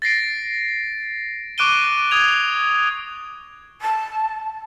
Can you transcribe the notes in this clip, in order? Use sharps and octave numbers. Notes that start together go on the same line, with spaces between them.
A6 A#6 C7 D7
C#6 D6 F#6 D7 D#7 G7
D#6 G#6 F7
A5